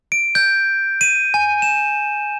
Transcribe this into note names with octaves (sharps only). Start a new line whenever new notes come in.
D7
G6
D#7
G#5
E7